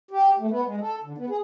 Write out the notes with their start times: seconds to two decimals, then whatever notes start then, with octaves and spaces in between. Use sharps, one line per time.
0.11 G4
0.39 A3
0.50 B3
0.65 G#3
0.80 A4
1.04 D3
1.18 B3
1.29 G#4